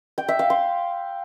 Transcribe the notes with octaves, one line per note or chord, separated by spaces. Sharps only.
G5
E5
F5
C6